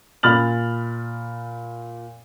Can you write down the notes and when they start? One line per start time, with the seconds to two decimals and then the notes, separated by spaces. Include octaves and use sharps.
0.23 A#2 B5 F6 A6 F#7